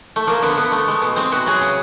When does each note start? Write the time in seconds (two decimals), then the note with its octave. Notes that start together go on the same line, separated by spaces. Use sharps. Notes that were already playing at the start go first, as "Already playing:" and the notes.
0.16 A3
0.27 F3 A#3
0.42 D3 B3
0.57 D3 B3
0.72 A3
0.88 G#3
1.02 B2
1.16 G#3 C4
1.32 B2 F#4
1.46 F#3 G#4
1.61 C#3